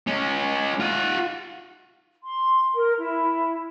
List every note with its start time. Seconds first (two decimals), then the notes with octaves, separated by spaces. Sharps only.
0.07 G#3 C#4
0.80 F4 F#5
2.23 C6
2.74 A#4
2.99 E4